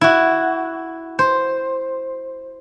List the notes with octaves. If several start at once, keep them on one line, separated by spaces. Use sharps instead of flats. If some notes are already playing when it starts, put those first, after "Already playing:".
E4 F#4
C5